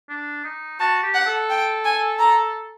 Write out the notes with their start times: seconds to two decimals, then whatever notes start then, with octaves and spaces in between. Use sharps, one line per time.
0.09 D4
0.44 D#4
0.79 F#4 A5
1.03 G4
1.14 F#5
1.26 A4
1.50 G5
1.84 G#5
2.19 A#5